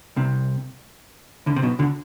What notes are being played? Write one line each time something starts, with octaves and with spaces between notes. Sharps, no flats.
C2 C3
D2 D3
C3
B1 B2
D2 D3